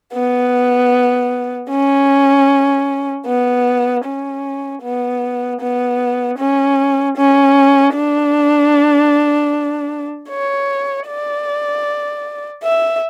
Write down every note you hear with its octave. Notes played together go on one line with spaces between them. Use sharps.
B3
C#4
B3
C#4
B3
B3
C#4
C#4
D4
C#5
D5
E5